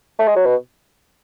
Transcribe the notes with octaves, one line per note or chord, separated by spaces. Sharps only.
A3
G#3
F#3
B2